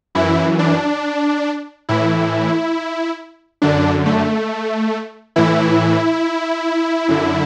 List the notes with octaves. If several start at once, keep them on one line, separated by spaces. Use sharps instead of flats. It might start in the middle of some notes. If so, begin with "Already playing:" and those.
F#2 E3 E4
D4
A2 E3 E4
F#2 D3 D4
A3
A2 E3 E4
F#2 D3